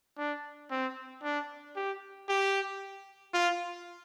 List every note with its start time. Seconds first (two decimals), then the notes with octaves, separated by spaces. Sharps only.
0.18 D4
0.71 C4
1.23 D4
1.76 G4
2.29 G4
3.34 F4